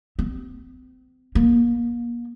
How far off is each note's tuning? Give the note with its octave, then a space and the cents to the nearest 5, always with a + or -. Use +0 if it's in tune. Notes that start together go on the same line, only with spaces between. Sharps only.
C4 -40
A#3 +30